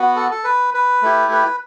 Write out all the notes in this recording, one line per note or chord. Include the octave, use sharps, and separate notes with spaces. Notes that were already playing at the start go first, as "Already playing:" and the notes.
Already playing: B3 F#4
A4
A4
B4
B4
A3 E4 G4
B4